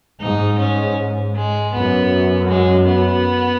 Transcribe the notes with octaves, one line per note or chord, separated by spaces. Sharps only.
G#2 D#4
C#4
G#3
F#2 B3
G#3
B3